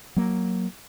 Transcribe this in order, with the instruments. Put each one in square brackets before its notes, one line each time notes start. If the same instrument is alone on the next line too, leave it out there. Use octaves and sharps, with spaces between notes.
[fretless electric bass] F#3 A#3